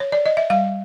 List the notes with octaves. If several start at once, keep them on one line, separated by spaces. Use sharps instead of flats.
C#5
D5
D#5
E5
G3 F5